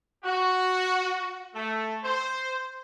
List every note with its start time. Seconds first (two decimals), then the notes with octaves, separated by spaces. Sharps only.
0.24 F#4
1.55 A3
2.04 C5